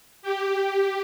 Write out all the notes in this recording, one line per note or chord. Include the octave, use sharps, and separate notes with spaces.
G4
G4